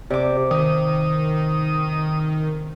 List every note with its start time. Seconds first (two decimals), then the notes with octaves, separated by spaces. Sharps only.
0.10 C3 G4 D5 D6
0.51 D#3 D#6